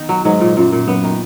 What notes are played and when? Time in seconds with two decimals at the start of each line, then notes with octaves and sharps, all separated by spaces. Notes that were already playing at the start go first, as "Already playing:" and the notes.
Already playing: D#3 B3 D#4
0.09 F#3
0.25 G#2 F#3
0.41 A#2
0.57 F#2 A#2
0.72 A#2
0.87 F#2 B3
1.04 D#3